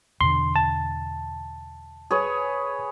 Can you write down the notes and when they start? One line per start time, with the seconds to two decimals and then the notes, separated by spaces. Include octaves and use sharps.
0.21 E2 B2 D3 C6
0.56 A5
2.11 G#4 B4 C#5